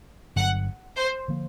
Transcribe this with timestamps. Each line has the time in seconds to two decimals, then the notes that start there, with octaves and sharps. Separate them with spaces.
0.36 G1 G2 D3 F#3 F#5
0.96 C5
1.28 D3 F3 A#3